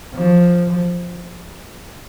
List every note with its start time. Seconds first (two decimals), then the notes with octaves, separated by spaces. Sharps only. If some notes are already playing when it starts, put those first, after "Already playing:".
0.14 F3